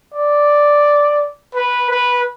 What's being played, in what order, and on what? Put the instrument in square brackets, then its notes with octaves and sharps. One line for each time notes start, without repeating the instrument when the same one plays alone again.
[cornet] D5
B4
B4